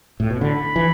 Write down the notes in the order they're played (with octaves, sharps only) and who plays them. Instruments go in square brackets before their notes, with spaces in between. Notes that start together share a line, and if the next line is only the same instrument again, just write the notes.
[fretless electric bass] A2
B2
[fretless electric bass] D3 [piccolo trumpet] B5
[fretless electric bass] E3